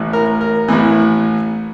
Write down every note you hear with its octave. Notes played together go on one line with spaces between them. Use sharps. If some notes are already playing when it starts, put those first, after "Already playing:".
Already playing: A1 A2 E3
A#4
A#4
A1 A2 E3